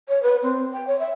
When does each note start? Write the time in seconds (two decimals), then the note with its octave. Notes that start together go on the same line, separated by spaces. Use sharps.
0.09 C#5
0.23 B4
0.43 C4
0.73 G5
0.87 C#5
0.99 E5